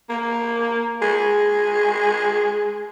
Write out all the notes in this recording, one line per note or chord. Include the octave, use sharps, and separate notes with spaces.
A#3
G#3